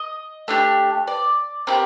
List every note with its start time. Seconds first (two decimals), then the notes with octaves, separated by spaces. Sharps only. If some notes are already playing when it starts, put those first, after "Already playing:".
Already playing: D#5
0.48 A3 D4 G4
1.07 D5
1.67 C4 D#4 G4 A#4